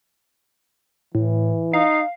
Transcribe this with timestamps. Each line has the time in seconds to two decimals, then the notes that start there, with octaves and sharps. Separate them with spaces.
1.15 A2 E3
1.73 D#4 F5